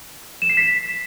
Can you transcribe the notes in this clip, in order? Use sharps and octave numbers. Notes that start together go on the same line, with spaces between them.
E7
C7
B6